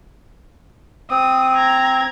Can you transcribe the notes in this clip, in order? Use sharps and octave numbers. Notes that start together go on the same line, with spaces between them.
C4 D#6
A#5 G#6